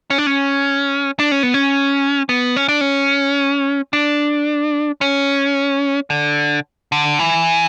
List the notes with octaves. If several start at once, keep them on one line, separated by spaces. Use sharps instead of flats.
C#4
D4
C#4
D4
C#4
B3
C#4
B3
C#4
D4
C#4
D4
C#4
D3
D3
E3